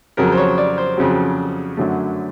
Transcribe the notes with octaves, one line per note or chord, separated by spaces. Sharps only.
F2 C#3 F#3 A#4
C5
C#5
D5
C5
F2 C#3 F#3
F#2 D3 F#3 A3